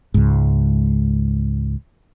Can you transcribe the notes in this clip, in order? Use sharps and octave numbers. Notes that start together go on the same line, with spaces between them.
C#2 G#2